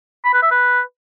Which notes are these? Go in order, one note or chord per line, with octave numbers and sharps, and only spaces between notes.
B5
B4
E5
B4